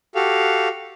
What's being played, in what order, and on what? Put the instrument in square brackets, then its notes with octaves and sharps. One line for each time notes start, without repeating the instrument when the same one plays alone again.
[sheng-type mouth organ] F#4 G4 A4 F5